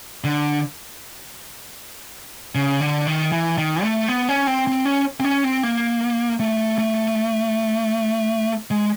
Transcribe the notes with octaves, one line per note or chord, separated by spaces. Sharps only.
D3
C#3
D3
D#3
E3
D#3
A3
B3
C#4
C4
C4
C#4
C4
C#4
C4
A#3
A3
A3
G#3